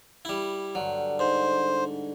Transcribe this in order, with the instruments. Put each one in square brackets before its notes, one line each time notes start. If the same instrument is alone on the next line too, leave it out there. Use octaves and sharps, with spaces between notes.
[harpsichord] G3 E4
[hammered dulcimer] G2 D3 [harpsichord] F#3
[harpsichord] G#2 [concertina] C5